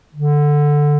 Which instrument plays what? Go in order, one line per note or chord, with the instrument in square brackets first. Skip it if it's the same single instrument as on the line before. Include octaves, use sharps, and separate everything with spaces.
[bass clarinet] D3